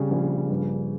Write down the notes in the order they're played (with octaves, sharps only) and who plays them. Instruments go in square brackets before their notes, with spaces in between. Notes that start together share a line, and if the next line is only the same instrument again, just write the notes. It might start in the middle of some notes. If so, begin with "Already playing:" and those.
Already playing: [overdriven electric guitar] C#3 [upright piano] G3 C4
[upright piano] A#1
G2